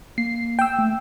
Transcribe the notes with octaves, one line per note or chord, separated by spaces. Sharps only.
A#3 C7
G5 E6
A3